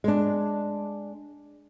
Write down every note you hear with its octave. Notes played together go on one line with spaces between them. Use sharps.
G#3 D4